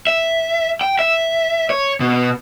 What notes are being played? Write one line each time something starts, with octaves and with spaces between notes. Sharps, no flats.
E5
G5
E5
C#5
B2